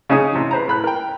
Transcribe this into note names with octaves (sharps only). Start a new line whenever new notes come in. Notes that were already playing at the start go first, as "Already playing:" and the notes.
C#3 C#4 D#4 G#4 C#5 D#6
C3 E3
B4 C5 A#5
A2 B5 F#6
A#4 G5